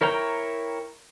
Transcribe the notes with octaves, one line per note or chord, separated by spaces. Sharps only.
E4 A#4 C#5 G5 A#5